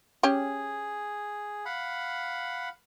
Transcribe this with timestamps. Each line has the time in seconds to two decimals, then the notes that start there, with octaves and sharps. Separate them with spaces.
0.23 C#4 G4 G#4
1.65 F5 F#5 B5